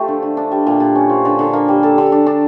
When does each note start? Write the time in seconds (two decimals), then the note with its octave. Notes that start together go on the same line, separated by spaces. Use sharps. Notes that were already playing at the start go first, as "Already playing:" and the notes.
Already playing: F3 A3 G4
0.08 D3
0.22 D3
0.37 D4
0.52 G3
0.67 A#2
0.80 A#2
0.95 C#4
1.10 F3
1.25 D3
1.39 D3
1.53 A#3
1.68 G3
1.83 A4
1.98 D3
2.12 D4
2.27 D4